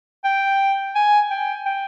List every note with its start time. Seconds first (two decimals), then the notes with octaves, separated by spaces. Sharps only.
0.24 G5
0.95 G#5
1.30 G5
1.65 G5